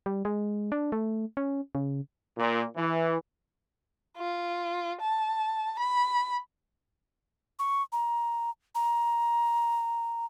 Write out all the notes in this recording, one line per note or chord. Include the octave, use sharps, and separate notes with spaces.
G3
G#3
D4
A3
C#4
C#3
A#2
E3
F4
A5
B5
C#6
A#5
A#5